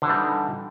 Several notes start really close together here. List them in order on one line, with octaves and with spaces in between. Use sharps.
D3 E3 G3 D#4